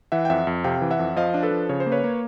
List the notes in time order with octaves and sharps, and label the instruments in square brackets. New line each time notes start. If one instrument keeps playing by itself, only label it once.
[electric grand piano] E3 E5 F#5
G5
F2 E5 F#5
F2
C3 F5 G5
E3
E5 F#5
F2
F3 D#5 F5
D4
A4 B4
F3
C#3 C#5
C5
A#3
B4 C#5
A#3